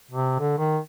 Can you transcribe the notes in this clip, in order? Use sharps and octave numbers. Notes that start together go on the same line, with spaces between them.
C3
D3
D#3